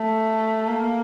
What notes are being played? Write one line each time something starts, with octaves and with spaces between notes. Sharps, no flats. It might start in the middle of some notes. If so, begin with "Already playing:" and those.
Already playing: A3
A#3